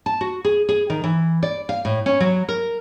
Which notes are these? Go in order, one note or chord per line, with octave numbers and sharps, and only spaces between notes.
A5
F#4
G#4
G#4
D#3
E3
D5
F5
A2
C#4
F#3
A#4